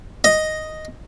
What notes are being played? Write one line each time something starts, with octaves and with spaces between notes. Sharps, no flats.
D#5